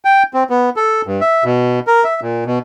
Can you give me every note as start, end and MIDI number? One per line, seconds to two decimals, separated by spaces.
0.05 0.23 79
0.34 0.43 60
0.50 0.70 59
0.76 1.02 69
1.07 1.21 43
1.21 1.44 76
1.44 1.80 47
1.87 2.04 70
2.04 2.20 76
2.22 2.44 46
2.46 2.59 47